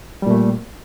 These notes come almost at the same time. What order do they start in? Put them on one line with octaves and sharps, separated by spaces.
G3 A#2 A3